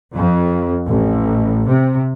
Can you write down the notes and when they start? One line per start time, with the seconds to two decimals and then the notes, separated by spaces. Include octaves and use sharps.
0.14 F2
0.87 A1
1.66 C3